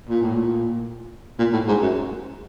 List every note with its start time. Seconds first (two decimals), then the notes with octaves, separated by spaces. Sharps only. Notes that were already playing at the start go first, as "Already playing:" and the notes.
0.09 A#2
0.22 A2
0.34 A#2
1.38 A#2
1.53 A2
1.68 G#2
1.82 F#2